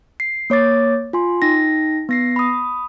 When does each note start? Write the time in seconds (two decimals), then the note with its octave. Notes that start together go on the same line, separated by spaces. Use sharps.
0.20 C7
0.50 A#3 C#5 D6 A6
1.13 F4 G#5 C6
1.42 D#4 G5 A#6
2.09 B3 A#6 C7
2.36 B5 D#6